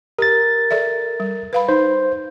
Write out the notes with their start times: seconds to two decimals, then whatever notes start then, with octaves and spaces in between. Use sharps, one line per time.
0.19 G4 A#4 A6
0.71 A4 D5 E5
1.20 G3
1.53 B4 F5 B5
1.68 D#4 C5